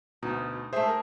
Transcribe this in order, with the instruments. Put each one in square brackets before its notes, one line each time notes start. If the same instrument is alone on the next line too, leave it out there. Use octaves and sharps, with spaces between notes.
[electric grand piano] D2 B2 [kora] D#4
[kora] A3 G#4 [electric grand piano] C5 E5
[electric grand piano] A#4